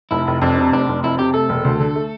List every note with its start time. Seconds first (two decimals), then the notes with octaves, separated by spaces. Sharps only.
0.11 F1 E4
0.27 F1
0.42 F2 D4
0.58 C3
0.72 F1 D4
0.89 F1
1.03 F2 E4
1.19 C3 G4
1.34 A3 A4
1.49 E1
1.65 D2
1.80 D3
1.95 A3